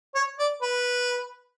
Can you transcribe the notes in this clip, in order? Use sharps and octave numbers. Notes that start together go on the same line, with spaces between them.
C#5
D5
B4